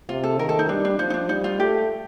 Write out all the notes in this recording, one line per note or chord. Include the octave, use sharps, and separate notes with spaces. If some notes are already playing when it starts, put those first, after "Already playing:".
C3 F4
A4
D#3 A#4
A4
D#4
G3 D4
D4
F3 D#4
D#4
D4
G3 D#4
F4
A3 G4